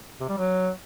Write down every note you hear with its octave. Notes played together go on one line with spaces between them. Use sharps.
C3
G3
F#3